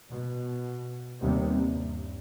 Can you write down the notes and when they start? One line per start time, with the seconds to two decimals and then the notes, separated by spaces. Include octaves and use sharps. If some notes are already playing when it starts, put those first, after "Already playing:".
0.11 B2
1.21 D#2 C3 G3 B3
1.60 G2